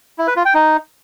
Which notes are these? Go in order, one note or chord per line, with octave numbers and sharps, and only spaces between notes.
E4
B4
F4
G5
D#4